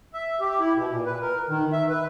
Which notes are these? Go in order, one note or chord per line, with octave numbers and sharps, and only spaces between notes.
E5
G4
E4
B2
A#2
B4
A#4
D#3
E5
B4